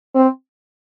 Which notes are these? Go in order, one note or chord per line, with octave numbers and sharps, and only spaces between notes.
C4